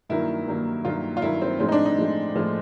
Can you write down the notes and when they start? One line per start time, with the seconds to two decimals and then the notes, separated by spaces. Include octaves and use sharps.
0.09 G2 D#3 F#3 A#3 E4
0.47 G2 D#3 F#3 A#3
0.85 G2 D#3 F#3 A#3 F4
1.17 F4
1.22 G2 D#3 F#3 A#3 E4
1.42 C4
1.60 A2 F3 G#3 C4
1.68 D#4
1.72 D4
1.85 D#4
1.97 A2 F3 G#3
2.35 A2 F3 G#3